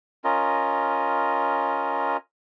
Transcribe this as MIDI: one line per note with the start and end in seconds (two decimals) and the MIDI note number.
0.25 2.17 61
0.25 2.17 65
0.25 2.17 70
0.25 2.17 75